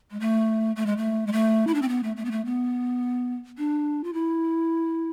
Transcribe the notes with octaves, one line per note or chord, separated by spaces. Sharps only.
G#3
A3
A3
G#3
A3
G#3
A3
E4
D4
C4
B3
A3
A3
B3
A3
B3
D4
F4
E4